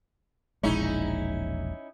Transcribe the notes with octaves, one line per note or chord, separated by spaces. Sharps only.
E1 A#1 G#3 C#4 D#4 E4